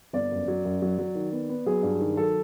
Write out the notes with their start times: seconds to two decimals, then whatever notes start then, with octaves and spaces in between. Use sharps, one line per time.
0.13 G1 D5
0.31 F#2
0.48 F#3
0.65 F#2
0.82 F#3
0.98 F#3
1.15 D#3
1.33 B3
1.49 B3
1.66 F#3 G#4
1.83 G2
2.00 D#3
2.17 F#3 A4